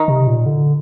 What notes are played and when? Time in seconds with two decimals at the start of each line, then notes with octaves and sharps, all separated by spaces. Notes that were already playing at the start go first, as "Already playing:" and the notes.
Already playing: D#3 D#4
0.08 C3
0.27 A#2
0.46 D3